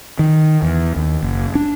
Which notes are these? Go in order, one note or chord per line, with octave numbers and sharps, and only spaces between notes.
D#3
E2
D#2
F#1
D4